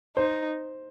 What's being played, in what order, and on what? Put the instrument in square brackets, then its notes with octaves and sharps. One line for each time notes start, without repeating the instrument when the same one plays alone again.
[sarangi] D#4 [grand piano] C5